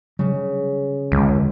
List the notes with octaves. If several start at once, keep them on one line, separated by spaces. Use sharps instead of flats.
C#3 F#3 G3
F1 C#2 D3 G#3